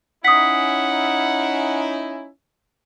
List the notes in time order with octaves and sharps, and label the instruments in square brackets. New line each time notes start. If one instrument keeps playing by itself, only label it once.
[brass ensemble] C#4 D#4 E4 [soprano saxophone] F#5 [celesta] D#6 B6